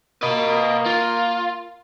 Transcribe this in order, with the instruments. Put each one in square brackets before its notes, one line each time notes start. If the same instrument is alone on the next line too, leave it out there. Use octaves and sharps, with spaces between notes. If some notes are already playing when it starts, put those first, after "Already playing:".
[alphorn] A#3 [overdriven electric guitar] B4 D#5
[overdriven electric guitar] F4